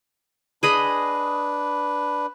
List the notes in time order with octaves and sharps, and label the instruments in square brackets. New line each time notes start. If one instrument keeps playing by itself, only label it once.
[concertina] D4 B4 [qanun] G#4 D#5 B5